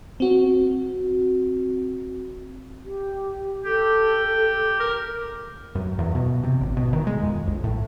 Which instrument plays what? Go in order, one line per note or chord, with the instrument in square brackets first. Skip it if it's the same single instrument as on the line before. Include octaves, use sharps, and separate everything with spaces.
[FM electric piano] C4 F#4
[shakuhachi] G4
[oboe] G4 [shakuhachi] A4
[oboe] A#4
[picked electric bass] F#2
E2
B2
C3
G#1
B2
D#3
G#3
F2
A#1
A2